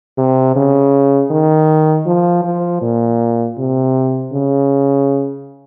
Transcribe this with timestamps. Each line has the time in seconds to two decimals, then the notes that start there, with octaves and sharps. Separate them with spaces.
0.18 C3
0.56 C#3
1.31 D#3
2.06 F3
2.44 F3
2.82 A#2
3.58 C3
4.33 C#3